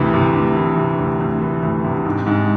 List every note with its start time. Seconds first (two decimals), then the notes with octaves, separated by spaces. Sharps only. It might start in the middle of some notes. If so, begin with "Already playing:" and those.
Already playing: D2 C3 E3
0.14 C3
0.35 D2
0.56 E3
0.78 C3
0.99 D2
1.20 D2
1.41 E3
1.63 D2
1.84 C3
2.05 G#2
2.27 G#2